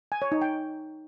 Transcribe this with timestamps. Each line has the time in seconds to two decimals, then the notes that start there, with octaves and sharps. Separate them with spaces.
0.12 G#5
0.22 C#5
0.32 D#4
0.42 G5